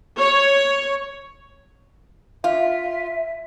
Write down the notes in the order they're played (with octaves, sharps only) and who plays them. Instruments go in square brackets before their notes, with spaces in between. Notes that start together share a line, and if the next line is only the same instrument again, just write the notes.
[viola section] C#5
[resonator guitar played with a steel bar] F4 [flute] E5